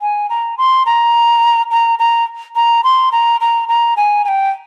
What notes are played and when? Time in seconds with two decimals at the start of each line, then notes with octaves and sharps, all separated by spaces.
0.01 G#5
0.30 A#5
0.58 C6
0.86 A#5
1.71 A#5
1.99 A#5
2.56 A#5
2.84 C6
3.12 A#5
3.41 A#5
3.69 A#5
3.97 G#5
4.25 G#5
4.28 G5